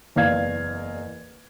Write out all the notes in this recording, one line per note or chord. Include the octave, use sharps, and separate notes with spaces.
F#1 E2 D5 F5 G#6